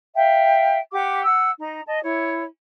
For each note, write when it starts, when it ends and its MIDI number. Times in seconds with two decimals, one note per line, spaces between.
0.15 0.78 76
0.15 0.78 77
0.15 0.78 79
0.92 1.25 67
0.92 1.25 78
0.92 1.25 86
1.25 1.49 78
1.25 1.49 88
1.59 1.81 63
1.59 1.81 82
1.87 2.00 75
1.87 2.00 81
2.03 2.44 64
2.03 2.44 73